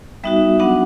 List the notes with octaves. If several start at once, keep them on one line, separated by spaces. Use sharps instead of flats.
G3 B3 D#4 F#4 E5
F#3 B3 D4 F#4 F#5